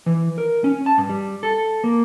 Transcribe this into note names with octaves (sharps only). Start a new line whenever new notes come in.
E3
A#4
C#4
A5
G2
G3
A4
A#3